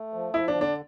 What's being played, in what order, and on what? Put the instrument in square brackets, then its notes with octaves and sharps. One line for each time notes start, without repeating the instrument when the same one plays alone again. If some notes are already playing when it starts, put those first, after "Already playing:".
Already playing: [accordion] A3
F3
[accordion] F3 [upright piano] E4
[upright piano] D4
[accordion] D3
[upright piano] D4